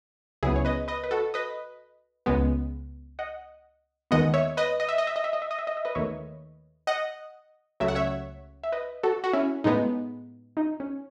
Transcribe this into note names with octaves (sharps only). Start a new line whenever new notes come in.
C#2 C#3 F#3 B3 E4 G#4
C#5
B4 D#5
B4 D#5
B4
F#4 A4
B4 D#5
C#2 C#3 G#3 B3
D#5 F#5
D#2 D#3 G#3 B3 D#5 F#5
C#5 E5
B4 D#5
D#5
E5
D#5
E5
D#5
E5
D#5
E5
D#5
E5
D#5
E5
B4 D#5
D#2 D#3 A3 C#5 E5
D#5 F#5
C#2 C#3 F#3 A3 E5
F#5
C#5 E5
E5
B4 D#5
F#4 A4
F#4
C#4 E4
A2 G#3 B3 D#4
D#4
C#4